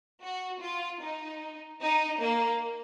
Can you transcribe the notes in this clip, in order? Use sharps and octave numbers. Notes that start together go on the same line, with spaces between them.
F#4
F4
D#4
D#4
A#3